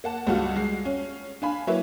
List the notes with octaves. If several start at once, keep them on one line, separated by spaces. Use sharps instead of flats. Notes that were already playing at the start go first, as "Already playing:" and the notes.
A#3 F#5 A5
C#2 G2 G3 F4 F#4 F#5
G#3 C7
C#4
D4 F5 G#5 B5
F#3 A#3 E4 B4 C#5 E5